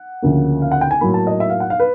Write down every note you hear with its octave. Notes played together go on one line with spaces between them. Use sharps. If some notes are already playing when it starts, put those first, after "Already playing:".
Already playing: F#5
D2 C#3 F3 A#3
F5
F#5
G5
G#5
A2 F#3 A#3 B5
A5
D#5
E5
F5
F#5
F5
B4